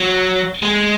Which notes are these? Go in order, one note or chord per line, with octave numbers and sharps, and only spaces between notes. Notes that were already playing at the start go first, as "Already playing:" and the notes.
Already playing: F#3
G#3